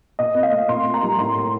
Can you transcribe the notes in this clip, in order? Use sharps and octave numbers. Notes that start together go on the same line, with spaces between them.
A#2 D#5
C4
F5
A3
A#2 C6
A#3
A#5
G3
A2 C6
A#3